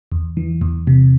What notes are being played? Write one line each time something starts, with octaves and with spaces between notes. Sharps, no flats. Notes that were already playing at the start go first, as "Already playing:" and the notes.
E2
E3
E2
C3